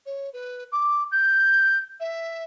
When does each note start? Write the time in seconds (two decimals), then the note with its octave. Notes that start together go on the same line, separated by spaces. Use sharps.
0.06 C#5
0.33 B4
0.72 D6
1.12 G6
2.00 E5